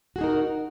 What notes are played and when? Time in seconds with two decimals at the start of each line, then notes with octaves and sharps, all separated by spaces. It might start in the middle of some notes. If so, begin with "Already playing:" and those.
0.16 F#4
0.18 G#4
0.21 D#4
0.24 A#4